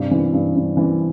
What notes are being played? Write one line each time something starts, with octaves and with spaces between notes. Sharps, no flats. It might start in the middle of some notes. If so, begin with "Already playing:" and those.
Already playing: G2 C3
E3
G2
G2
E3